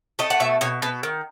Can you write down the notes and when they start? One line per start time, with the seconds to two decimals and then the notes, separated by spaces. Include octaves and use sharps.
0.19 A3 D#5
0.30 F#5
0.40 B2 E5
0.61 B2 C#5
0.82 B2 B4
1.03 D#3